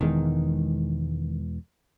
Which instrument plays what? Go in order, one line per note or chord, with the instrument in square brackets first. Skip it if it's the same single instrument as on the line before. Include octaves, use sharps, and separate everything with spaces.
[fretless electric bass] E1 E2 G#3 [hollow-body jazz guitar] D#3